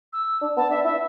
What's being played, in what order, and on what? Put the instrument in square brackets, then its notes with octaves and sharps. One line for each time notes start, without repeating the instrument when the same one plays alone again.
[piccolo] E6
[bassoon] D4
[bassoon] B3 [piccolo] A5
[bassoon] D4 [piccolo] E5
[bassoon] E4 [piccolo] E5